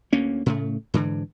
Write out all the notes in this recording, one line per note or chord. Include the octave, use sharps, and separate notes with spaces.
D2 A#3 C#4
A2 C#3 A3
G#2 D3 E3